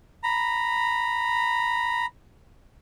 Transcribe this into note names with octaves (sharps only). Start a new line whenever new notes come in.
A#5 B5